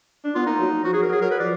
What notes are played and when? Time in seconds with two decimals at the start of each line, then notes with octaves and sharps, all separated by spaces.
0.24 D4
0.35 B3 F4
0.46 A#3 D#4
0.59 F#3
0.84 F3 F#4
0.93 F#3 G#4
1.02 A#4
1.09 F#3 G#4
1.21 F#3 A#4
1.31 B4
1.40 F3 D5